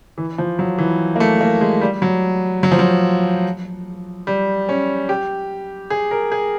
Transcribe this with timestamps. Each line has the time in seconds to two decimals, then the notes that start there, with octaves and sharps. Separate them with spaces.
0.18 E3
0.38 F3
0.59 F#3
0.78 E3
1.16 A#3
1.20 A3
1.41 A#3
1.61 G#3
1.81 G3
2.02 F#3
2.63 F#3
2.71 F3
2.79 F#3
4.27 G3
4.69 C#4
5.09 G4
5.90 G#4
6.11 A#4
6.32 G#4